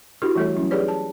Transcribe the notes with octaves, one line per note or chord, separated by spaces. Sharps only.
D4 E4 F#4 G4 A#4
E3 G3 A3 A4 C#5
F#3 C#4 E4
D#4 G4 G#4 B4 C#5 D5
A5